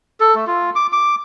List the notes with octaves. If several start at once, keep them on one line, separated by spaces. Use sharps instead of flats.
A4
A3
F4
D6
D6